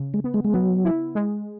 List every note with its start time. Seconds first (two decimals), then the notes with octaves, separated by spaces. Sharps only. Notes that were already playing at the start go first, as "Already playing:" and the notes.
Already playing: C#3
0.14 G#3
0.24 B3
0.34 G#3
0.44 G#3
0.53 F#3 B3
0.85 E4
1.15 G#3